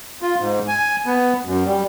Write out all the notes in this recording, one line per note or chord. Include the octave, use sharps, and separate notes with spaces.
F4
G#2
G#5
B3
F#2
G3